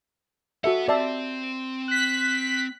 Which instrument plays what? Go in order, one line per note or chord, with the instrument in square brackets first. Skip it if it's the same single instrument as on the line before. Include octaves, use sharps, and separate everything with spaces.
[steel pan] F#4 A4 E5 [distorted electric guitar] B4 F#5
[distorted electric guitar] C4 C5 [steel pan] D5 E5 A5
[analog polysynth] F#6 B6